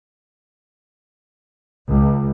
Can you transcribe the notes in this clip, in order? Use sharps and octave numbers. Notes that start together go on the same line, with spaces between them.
C#2